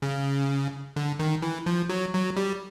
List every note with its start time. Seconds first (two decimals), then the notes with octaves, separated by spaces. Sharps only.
0.02 C#3
0.96 D3
1.19 D#3
1.42 E3
1.66 F3
1.89 F#3
2.13 F#3
2.37 G3